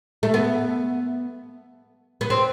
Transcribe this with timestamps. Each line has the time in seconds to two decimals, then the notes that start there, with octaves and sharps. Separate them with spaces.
0.23 A3
0.34 B3
2.21 B3
2.30 C4